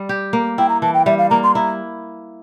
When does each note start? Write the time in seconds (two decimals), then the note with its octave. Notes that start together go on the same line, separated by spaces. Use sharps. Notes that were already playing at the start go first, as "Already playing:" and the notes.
Already playing: G3
0.09 G4
0.33 A#3
0.58 E4 G5
0.69 A#5
0.82 E3 A5
0.94 G5
1.06 G3 E5
1.18 F5
1.30 A#3 A#5
1.43 C6
1.55 E4 A#5